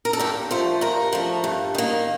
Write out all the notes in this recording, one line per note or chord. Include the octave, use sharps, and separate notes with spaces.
A#4
A4
G2 G4
F3 A3 C5
G2 A#4
F3 A3
G2
D#3 A#3